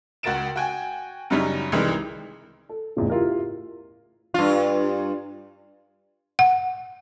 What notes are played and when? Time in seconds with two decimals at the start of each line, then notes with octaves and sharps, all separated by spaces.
0.23 C#2 F#4 A#4 A6 D7 E7
0.56 F#4 G5 G#5
1.30 F#2 C#3 F#3 G3 C#4 D#4
1.72 C2 D#3 E3 G3 G#3
2.69 A4
2.97 A1 E2 C#3
3.10 E4 F4 G4 A#4
4.34 G2 F4
6.39 F#5